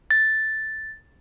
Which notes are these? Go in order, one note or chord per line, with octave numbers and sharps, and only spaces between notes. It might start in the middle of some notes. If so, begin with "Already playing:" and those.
A6